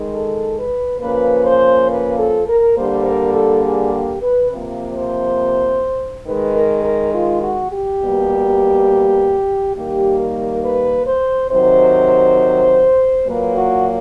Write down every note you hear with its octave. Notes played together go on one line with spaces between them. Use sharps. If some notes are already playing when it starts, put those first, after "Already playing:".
Already playing: D#3 G#3
A4
B4
C#3 F3 A#3 B4
C5
B4
A4
A#4
D3 G3 A#3 C5
A#4
A4
G#4
G4
B4
C3 F3 A#3
C5
D#3 G#3 B4
A#4
A#4
F4
F#4
G4
B2 G3 A#3
D#3 G3 A#3 G4
A#4
B4
C5
C3 D#3 F#3 C5
A#2 F#3 A#3 B4
F#4